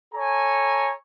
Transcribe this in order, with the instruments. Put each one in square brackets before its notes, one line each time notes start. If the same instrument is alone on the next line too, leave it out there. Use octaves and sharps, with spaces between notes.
[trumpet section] A4 C#5 G#5 A#5